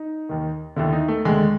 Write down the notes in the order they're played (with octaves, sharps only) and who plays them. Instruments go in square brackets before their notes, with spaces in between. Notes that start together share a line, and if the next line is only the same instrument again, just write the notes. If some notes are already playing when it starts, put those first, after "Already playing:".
Already playing: [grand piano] D#4
D#2 D#3
D#2 D3 E4
D#4
A3
D#2 D3 G#3